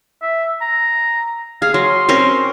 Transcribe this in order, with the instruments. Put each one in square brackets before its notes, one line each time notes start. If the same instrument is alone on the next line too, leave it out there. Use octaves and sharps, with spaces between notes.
[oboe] E5
A#5
[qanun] G#4 [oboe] F5
[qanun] F#3 [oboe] C6
[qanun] C4 C#4 A#4